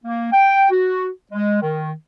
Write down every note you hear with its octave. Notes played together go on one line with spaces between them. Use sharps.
A#3
G5
F#4
G#3
D#3